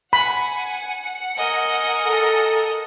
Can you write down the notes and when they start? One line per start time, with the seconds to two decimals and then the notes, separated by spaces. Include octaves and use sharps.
0.13 F#5 G#5 B5 C#7
1.35 A#4 D#5 G#5
2.05 A4